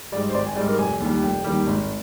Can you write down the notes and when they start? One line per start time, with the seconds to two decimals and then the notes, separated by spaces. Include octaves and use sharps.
0.12 G#2 G3 D5
0.29 C5
0.34 G#1 D5
0.46 G#5
0.56 G#2 G3 D5
0.68 A#4
0.78 F1 G#5
1.00 D#2 D#3 G3
1.23 F1 G5
1.44 D#2 D#3 G3
1.67 G#1